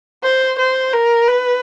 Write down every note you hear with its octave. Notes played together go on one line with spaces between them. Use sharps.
C5
C5
A#4
B4